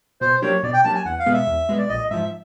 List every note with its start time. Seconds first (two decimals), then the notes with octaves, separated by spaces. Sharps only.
0.21 B2 C5
0.42 F#3 A#3 D4 G4 C#5
0.63 B2 D5
0.74 G5
0.84 F#3 A#3 D4 G4 A5
0.95 G#5
1.05 E2 F#5
1.19 F5
1.26 B2 G#3 B3
1.33 E5
1.47 E2
1.68 B2 G#3 B3
1.78 D5
1.89 A#1 D#5
2.10 G#2 F3 E5